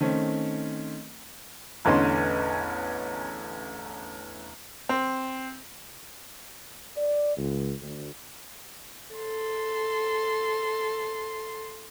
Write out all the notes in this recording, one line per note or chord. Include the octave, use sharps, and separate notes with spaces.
D#3 A3 C4 C#4
A1 E2 D3 C#4 D#5 C6
C4
D5
C#2
D2
A4 C6